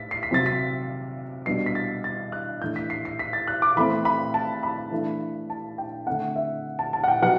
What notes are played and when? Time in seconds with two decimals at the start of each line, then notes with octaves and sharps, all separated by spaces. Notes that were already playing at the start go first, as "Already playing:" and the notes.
Already playing: A2 A3 A6 B6
0.11 C7
0.23 B6
0.31 C3 F#3 C4 A6
0.46 B6
1.46 B2 G3 D4 C7
1.66 B6
1.75 A6
2.04 A6
2.32 F#6
2.61 A2 E3 A3 D4 G6
2.76 B6
2.90 C7
3.05 C7
3.19 B6
3.33 A6
3.47 F#6
3.62 D6
3.76 E3 A3 C4 B5
4.05 B5
4.34 A5
4.63 B5
4.91 E3 A3 D4
5.50 A5
5.78 G5
6.07 D3 A3 C4 F#5
6.36 E5
6.79 A5
6.93 A5
7.04 F#5
7.08 G5
7.22 B2 F#3 B3 F#5